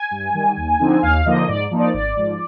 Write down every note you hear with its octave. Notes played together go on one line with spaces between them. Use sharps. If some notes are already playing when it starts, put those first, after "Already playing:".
Already playing: G#5
G2
D#3 G3
D#2
D3 F3 C4 D#4
D#2 F5
D3 F3 A#3 D#4 D#5
G#2 D5
F3 A#3 D#4
D5
G#1 D5
G#2 F3